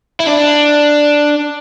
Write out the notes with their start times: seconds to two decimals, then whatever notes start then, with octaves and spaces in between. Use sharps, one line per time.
0.20 E4
0.26 D4